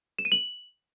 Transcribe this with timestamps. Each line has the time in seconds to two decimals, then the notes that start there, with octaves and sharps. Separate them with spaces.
0.19 E7
0.25 D#7
0.32 F#7